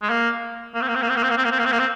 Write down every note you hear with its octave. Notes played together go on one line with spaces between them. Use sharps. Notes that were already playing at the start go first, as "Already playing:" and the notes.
G#3
A#3
A#3
C4
A#3
C4
A#3
C4
A#3
C4
A#3
C4
A#3
C4
A#3
C4
A#3
C4